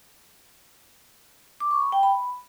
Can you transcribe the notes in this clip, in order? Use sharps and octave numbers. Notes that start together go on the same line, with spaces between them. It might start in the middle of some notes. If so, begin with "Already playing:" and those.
D6
C#6
B5
G5
B5